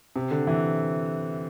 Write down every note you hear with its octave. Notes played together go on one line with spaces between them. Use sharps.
C3
D3
E3